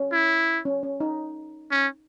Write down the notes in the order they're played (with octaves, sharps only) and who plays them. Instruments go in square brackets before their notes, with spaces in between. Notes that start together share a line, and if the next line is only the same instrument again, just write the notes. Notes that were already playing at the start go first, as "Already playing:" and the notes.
Already playing: [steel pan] C#4
[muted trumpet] E4
[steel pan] C#4
C#4
D#4
[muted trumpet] C#4